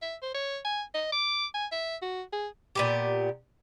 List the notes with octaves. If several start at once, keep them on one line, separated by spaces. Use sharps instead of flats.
E5
C5
C#5
G#5
D#5
D6
G#5
E5
F#4
G#4
A#2 B3 G4